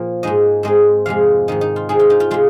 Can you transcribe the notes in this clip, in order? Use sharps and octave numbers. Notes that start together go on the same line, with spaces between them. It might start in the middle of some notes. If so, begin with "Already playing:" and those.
Already playing: A#2 F3 A#3
G#2 G#3 D#4 D#5
G#2 G#3 C4 D#4 D#5
F2 C3 G#3 F5
G#2 D#3 G#3 D#4
D#4
F4
D#3 C4 D#4 G#4
F4
D#4
F4
C3 G#3 F4